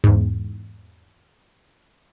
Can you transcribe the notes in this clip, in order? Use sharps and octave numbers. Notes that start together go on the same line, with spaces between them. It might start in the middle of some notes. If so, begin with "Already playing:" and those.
E2 G#2